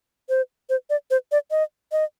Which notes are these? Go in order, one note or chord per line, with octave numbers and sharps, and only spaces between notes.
C5
C5
D5
C5
D5
D#5
D#5